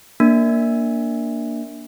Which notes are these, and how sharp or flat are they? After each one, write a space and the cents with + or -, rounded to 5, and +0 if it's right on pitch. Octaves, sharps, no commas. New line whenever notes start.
A#3 +5 D4 +0